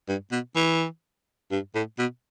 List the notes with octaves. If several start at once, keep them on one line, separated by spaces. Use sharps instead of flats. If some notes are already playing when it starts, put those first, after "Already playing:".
G2
B2
E3
G2
A2
B2